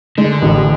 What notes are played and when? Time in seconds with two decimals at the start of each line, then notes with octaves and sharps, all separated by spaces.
0.18 D3 G#3
0.42 A1